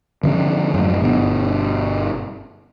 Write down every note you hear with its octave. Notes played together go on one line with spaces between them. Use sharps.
D3 F3 C4 C#4
F#2 A2
G1 B2